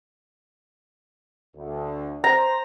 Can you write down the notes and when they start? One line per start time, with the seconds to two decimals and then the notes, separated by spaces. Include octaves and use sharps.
1.56 D2
2.24 C5 A#5